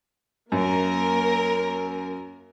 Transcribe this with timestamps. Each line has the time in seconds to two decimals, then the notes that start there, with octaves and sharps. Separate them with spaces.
0.52 F#2 A#3 A#4